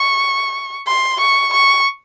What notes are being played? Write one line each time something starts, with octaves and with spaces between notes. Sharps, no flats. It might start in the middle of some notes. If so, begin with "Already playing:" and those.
Already playing: C#6
C6
C#6
C#6